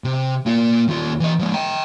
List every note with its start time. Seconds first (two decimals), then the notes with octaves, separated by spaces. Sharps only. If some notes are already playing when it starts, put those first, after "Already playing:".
0.04 C3
0.46 A#3 F4
0.88 D#2 F4
1.20 E3 D#5
1.39 F3 G#3
1.54 G5 A#5